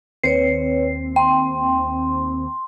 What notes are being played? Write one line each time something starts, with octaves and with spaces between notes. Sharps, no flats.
D#2 C4 B4 C#5 C7
G5 C6